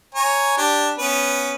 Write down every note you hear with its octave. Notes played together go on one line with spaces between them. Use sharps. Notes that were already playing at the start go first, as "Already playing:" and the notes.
C#5 G#5 A#5
D4 G4
B3 C#4 B4